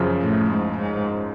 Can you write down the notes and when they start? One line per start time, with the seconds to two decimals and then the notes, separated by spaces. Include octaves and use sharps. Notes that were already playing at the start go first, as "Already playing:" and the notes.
Already playing: F#2 C#3 F3
0.21 A2
0.50 G#2
0.78 G#2